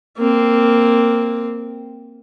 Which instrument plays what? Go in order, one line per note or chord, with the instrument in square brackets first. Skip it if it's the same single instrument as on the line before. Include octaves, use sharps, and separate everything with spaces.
[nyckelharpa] A#3 C4